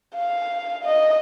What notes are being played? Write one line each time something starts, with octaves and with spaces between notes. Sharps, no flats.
F5
D#5